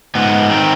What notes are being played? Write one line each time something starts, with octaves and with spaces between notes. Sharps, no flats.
G#2 B3
D#3 C4